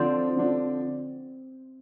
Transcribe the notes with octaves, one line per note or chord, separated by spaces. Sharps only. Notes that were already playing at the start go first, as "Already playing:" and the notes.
Already playing: D3 F3 C4 D4
D3 F3 D4